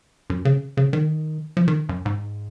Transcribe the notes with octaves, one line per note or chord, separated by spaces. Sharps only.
F#2
C#3
C#3
D#3
F3
D#3
F#2
G#2